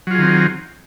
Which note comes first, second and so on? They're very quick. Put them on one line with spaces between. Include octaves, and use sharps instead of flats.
F#3 F4 G#4 D#3 C4